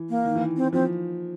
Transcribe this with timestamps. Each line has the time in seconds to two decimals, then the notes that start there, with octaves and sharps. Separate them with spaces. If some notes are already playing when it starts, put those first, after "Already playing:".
Already playing: E3
0.09 A#3
0.25 D#3
0.36 E3
0.57 C4
0.73 F3 C4